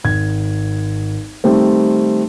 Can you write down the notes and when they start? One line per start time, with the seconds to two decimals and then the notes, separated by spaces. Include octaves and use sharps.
0.04 G#1 G#6
1.44 D#3 G3 A3 C4